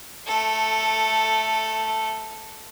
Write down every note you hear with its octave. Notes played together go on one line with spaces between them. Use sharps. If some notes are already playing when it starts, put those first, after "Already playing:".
A3 A4